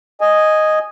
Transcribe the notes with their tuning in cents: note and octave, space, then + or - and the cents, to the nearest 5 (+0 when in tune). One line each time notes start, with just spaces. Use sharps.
D#5 +0 G#5 +0